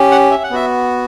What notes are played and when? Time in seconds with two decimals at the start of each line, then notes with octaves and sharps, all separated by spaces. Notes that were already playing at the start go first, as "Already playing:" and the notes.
Already playing: C#4 G4
0.11 F#5
0.31 E5
0.44 F#5
0.50 B3 F#4 E5